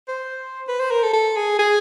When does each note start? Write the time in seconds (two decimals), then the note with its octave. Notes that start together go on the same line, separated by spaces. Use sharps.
0.08 C5
0.68 B4
0.80 C5
0.91 A#4
1.03 A4
1.13 A4
1.36 G#4
1.59 G#4